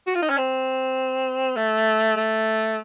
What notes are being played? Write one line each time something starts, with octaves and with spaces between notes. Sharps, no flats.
F#4
F4
D#4
C#4
C4
A3
A3